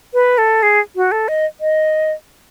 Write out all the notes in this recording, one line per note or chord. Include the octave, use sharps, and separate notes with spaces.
B4
A4
G#4
F#4
A4
D#5
D#5